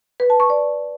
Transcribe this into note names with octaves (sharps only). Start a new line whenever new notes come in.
B4
A5
C#6
D5